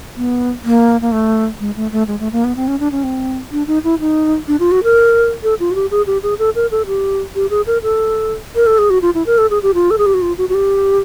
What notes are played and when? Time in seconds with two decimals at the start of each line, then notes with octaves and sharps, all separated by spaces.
0.16 B3
0.64 A#3
1.01 A#3
1.12 A3
1.60 G#3
1.76 A3
1.92 A3
2.07 G#3
2.20 A3
2.33 A#3
2.44 B3
2.56 C4
2.68 C#4
2.80 D4
2.92 C#4
3.04 C4
3.52 D4
3.67 D#4
3.84 E4
4.00 D#4
4.48 D4
4.60 F4
4.72 F#4
4.84 A#4
5.43 A4
5.60 F4
5.71 F#4
5.75 G4
5.91 G#4
6.07 G4
6.23 G#4
6.39 A4
6.55 A#4
6.71 A4
6.87 G4
7.35 G4
7.50 G#4
7.67 A#4
7.83 A4
8.55 A#4
8.67 A4
8.78 G#4
8.90 F#4
9.02 F4
9.15 E4
9.26 A#4
9.38 A4
9.50 G#4
9.63 G4
9.74 F4
9.91 A4
9.98 G#4
10.06 G4
10.14 F#4
10.22 F4
10.38 F#4
10.49 F#4
10.54 G4